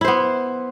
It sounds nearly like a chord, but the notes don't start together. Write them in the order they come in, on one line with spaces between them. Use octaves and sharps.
E4 C5 B3